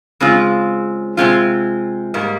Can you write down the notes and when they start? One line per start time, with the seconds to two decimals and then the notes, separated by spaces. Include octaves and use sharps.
0.20 C#3 G#3 C4 F4
1.17 C3 D#3 G#3 C4 F4
2.14 G#2 G3 A#3